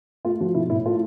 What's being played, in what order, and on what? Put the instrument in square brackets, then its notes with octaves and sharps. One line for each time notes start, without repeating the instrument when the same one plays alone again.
[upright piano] A3 F4
F3 F#4
B1 E4
A2 E4
A3 F4